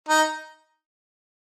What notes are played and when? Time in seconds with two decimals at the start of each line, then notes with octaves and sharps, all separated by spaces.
0.08 D#4